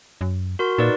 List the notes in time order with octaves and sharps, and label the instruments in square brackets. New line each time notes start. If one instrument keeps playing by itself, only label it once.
[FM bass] F#2
[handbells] F#4 A#4 C6
[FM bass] A#2 [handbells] D#4 B4 D5